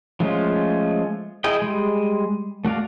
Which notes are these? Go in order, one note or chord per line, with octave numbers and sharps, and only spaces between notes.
F3 G#3 A3 C#4 F4
E4 G#4 D#5 G5
G3 G#3
A3 F#4 D5 F5